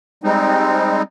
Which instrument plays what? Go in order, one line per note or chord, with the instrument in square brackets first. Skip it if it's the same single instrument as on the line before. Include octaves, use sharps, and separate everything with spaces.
[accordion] G3 G#3 C4 D#4